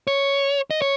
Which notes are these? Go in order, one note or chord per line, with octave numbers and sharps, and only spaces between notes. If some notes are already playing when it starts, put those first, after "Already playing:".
C#5
D#5
C#5